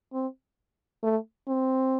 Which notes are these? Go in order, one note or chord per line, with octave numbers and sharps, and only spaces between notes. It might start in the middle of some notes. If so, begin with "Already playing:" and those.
C4
A3
C4